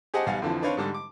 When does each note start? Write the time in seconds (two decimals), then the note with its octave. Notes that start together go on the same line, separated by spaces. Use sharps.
0.14 G4 G#4 C5 D#5 F#5 A5
0.26 B1 G3 F5 F#5 G#5
0.42 F2 D3 E3 F3
0.63 C4 D4 B4 C#5 F5
0.77 G#2 D3 G3
0.94 D6